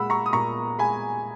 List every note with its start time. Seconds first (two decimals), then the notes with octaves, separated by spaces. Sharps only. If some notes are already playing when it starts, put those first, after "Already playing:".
Already playing: A#2 G#3 F#5 B5 E6
0.10 A#5 C#6
0.26 D#6
0.33 A#2 A#5 C#6
0.78 G#3 G#5 B5